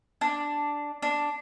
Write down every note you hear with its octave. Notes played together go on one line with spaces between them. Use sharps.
D4
D4